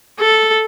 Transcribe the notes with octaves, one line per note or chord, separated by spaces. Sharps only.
A4